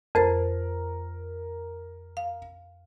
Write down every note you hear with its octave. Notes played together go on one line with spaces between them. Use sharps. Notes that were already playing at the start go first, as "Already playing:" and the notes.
F2 A#4 C5 A6
F5